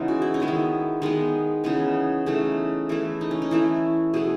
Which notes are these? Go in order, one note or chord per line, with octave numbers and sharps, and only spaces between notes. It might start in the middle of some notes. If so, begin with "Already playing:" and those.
Already playing: C#3 E3 G#3 B3 D#4
F#4
E4
D#4
D#3 G#3 B3
E4
D#3 G#3 B3 D#4
C#3 E3 B3 D#4
C#3 E3 A3 D#4
E3 A3 E4
D#4
C#4
D#4
E3 A3 E4
B2 A3 G#4